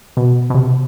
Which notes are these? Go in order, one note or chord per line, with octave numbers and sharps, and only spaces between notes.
B2
B2
C3